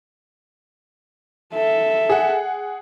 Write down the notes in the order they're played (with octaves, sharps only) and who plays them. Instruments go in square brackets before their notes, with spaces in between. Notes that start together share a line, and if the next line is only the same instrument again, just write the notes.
[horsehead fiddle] A4 E5
[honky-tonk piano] G#4 F#5